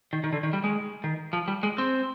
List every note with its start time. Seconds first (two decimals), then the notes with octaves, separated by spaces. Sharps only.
0.13 D#3
0.24 D#3
0.33 D3
0.43 D#3
0.53 G3
0.64 G#3
1.04 D#3
1.33 F3
1.48 G3
1.63 G#3
1.78 C4